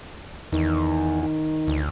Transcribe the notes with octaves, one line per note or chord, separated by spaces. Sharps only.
E2 D#3
D#3
D2